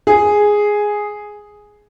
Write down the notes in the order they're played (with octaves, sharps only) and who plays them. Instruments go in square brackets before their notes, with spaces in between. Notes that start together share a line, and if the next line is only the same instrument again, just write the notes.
[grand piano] G#4